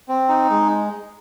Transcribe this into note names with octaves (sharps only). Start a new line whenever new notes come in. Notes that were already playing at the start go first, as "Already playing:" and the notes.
C4
D#4
G#3